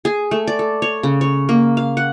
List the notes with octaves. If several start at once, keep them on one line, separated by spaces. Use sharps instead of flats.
G#4
A3
D5
A4
C#5
C#3
C#5
A#3
F5
F#5